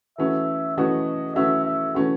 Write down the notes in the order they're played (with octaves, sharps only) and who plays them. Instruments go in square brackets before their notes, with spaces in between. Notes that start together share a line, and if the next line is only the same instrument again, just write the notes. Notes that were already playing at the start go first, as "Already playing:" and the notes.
[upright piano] E3 A3 C#4 F#4 [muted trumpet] E5
[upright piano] E3 A3 C#4 F#4 [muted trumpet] D#5
[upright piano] E3 A3 C#4 F#4 [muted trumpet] E5
[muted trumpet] E5
[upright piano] E3 A3 C#4 F#4